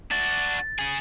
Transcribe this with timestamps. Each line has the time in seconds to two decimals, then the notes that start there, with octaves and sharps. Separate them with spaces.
0.11 D4 F#4 A6
0.79 C#4 G#4